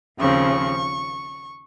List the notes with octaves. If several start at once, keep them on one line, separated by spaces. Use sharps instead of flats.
D#2 C#3 F3 C4 C#6